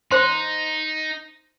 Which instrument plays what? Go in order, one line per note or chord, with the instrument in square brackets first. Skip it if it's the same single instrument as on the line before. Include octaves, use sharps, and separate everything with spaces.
[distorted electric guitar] D#4 [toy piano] C5 C6